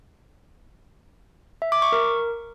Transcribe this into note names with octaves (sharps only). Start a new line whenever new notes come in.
E5
D6
C#6
A#4